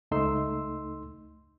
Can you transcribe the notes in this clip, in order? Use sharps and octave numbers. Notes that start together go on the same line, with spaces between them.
C#2 A3 D#4 C6 E6